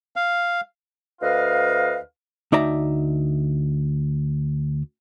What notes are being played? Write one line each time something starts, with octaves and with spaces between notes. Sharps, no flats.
F5
D2 B4 D#5 F5
D2 D#4 D5 E5 A#5